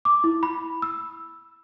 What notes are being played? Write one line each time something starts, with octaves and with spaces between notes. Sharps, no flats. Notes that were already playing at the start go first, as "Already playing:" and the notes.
D6
E4
B5
E6